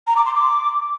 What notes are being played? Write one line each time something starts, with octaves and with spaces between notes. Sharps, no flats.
A#5
D6
C6
D6